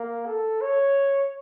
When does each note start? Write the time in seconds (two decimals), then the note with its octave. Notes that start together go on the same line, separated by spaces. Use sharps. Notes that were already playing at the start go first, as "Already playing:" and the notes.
Already playing: A#3
0.27 A4
0.61 C#5